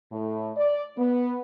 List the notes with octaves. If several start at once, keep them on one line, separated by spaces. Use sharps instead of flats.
A2
D5
B3